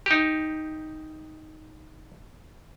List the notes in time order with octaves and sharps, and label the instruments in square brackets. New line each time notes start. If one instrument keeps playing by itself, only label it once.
[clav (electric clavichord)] D#4 G4